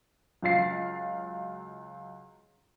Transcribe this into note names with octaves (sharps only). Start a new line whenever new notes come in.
C#2 F#3 F4 F5 A6 C7